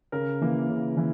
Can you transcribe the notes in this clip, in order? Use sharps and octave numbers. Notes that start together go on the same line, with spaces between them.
C#3 A#4
E3 A#3
C#3
E3